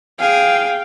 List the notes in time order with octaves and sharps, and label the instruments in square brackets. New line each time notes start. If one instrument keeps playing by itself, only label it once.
[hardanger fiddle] G#4 [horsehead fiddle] F5 G5